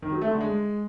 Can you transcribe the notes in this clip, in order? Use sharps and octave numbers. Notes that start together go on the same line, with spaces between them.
D#3
F#3
A3
D3
G#3